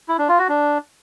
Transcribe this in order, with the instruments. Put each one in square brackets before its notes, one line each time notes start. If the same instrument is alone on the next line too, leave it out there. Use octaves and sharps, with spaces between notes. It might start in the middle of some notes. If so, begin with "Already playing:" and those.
[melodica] E4
D4
F4
F#4
D4